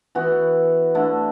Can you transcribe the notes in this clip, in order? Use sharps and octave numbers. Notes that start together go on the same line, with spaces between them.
E3 B3 F#4
D3 A3 E4